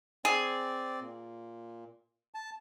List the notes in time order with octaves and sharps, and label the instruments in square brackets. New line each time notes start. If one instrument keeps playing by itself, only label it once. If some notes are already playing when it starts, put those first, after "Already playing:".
[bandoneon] C4 D5 [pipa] G#4
[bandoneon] A#2
A5